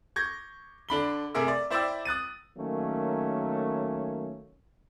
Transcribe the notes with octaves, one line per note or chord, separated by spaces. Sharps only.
C#6 G6 G#6 A#6
D3 D4 B5 G7
C3 A3 G#4 A#4 E5 E6
D5
E4 C5 D5 E5 G5 E6
D#6 F#6 A6 D#7
D#3 F#3 A3 A#3 C#4